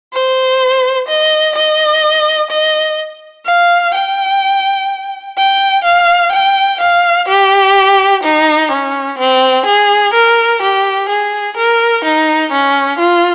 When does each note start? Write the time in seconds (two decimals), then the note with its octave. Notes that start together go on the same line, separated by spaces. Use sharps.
0.13 C5
1.08 D#5
1.55 D#5
2.51 D#5
3.46 F5
3.94 G5
5.38 G5
5.85 F5
6.32 G5
6.81 F5
7.29 G4
8.24 D#4
8.71 C#4
9.19 C4
9.67 G#4
10.14 A#4
10.62 G4
11.10 G#4
11.57 A#4
12.05 D#4
12.52 C#4
12.99 F4